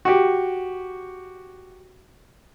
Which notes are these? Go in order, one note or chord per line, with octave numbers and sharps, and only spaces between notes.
F#4 G4